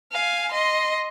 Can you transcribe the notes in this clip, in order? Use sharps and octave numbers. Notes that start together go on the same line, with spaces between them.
F5 G#5
D#5 C6